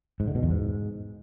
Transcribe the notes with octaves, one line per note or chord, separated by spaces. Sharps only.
G#2
D3
B2
E2
G#2